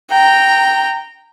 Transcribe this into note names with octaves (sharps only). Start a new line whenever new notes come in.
G5 A#5